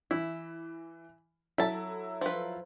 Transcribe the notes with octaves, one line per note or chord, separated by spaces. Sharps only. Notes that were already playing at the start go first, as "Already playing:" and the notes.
E3 E4
F#3 E4 A4 A5 B5
F3 B4